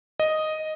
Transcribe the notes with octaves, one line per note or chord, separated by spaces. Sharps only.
D#5